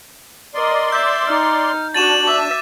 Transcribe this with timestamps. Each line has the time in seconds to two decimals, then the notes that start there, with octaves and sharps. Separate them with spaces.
0.54 A#4 D5 D#5 C6
0.92 E5 G6
1.27 D#4 F6
1.94 D4 F#4 A6 D#7 E7 F#7
2.27 E5 D6